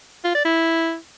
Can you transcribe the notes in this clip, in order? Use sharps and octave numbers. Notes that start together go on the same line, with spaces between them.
F4
D5
E4